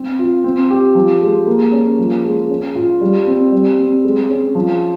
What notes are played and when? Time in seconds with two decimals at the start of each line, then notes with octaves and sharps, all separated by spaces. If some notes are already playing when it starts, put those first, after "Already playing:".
Already playing: C4
0.19 F4
0.44 C4
0.70 G4
0.95 F3
1.22 G#3
1.47 A#3
1.72 C#4
1.99 F3
2.24 G#3
2.50 C#4
2.75 F4
3.01 G3
3.27 C4
3.52 G3
3.79 C4
4.04 G#3
4.30 C#4
4.55 F3